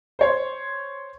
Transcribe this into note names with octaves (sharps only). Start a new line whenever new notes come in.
C5 C#5 C6